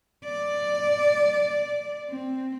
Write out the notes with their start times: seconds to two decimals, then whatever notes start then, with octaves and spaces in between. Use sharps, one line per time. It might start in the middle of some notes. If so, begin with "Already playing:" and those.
0.24 D5
2.09 C4